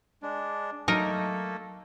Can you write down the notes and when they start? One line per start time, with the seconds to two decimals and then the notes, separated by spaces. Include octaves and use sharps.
0.23 G#3 D4
0.88 F#3 A3 A#3 D#4 A4 A#4